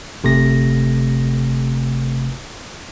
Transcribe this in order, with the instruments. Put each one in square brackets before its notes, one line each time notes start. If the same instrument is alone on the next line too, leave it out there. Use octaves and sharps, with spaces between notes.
[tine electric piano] G1 C3 A3 A#6